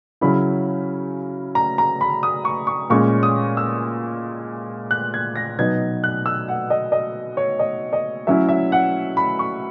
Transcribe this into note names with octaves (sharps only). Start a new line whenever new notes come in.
C#3 F#3 C#4 E4 B5
A#5
A#5
B5
D#6
C#6
C#6
A#2 G#3 C#4 C#6
D#6
E6
F#6
G#6
A#6
B2 F#3 B3 D#4 G#6
F#6
E6
F#5
D#5
D#5
C#5
D#5
D#5
F#3 C#4 E4 E5
E5
F#5
B5
C#6